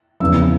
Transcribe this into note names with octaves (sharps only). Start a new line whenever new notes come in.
E2 C#3 F3 E6